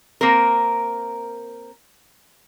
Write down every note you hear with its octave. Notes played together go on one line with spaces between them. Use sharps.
A#3 C4 A#4